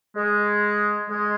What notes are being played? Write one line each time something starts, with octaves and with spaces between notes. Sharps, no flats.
G#3
G#3